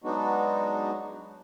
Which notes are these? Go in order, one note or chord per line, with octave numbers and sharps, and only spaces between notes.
F#3 G#3 B3 D4 D#4 F#4